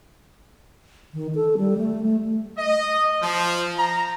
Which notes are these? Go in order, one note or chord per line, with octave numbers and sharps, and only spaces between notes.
D#3
A4
G3
A3
A3
D#5
F3
A#5